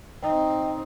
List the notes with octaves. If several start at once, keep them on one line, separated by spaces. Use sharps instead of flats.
C4 D#4 D#5 G5